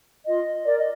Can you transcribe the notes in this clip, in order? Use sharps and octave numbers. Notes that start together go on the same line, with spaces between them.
F4 D#5
A#4 D5
D#5